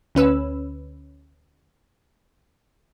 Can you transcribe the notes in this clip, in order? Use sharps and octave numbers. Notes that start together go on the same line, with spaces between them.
D2 C#4 B4 E6